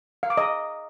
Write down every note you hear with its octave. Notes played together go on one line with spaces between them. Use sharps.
F5
D6
D#5